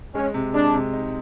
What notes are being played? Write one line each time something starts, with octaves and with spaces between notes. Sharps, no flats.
G#3 C#4
C3
G#3 D4
C3
D#4